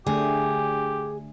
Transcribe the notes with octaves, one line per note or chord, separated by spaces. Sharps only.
D3 A3 D4 G4 G#4